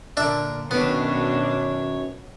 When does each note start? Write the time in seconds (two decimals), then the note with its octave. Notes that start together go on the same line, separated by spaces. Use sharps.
0.17 A#2 D3 D4 A#4 E5
0.71 F#2 B2 D#3 B3 D4 B4 C#5